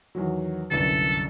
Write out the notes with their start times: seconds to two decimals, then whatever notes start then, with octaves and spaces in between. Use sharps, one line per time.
0.15 E2 D#3 F#3
0.71 G1 C2 F#2 A4